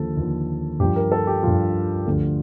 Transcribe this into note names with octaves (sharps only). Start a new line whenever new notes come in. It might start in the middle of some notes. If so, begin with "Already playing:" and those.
Already playing: D#2 D3 F3 A4
D#2 D3 F3
G2 F3 G4
A#4
A4
G4
G2 F3 F4
D2 D3 F3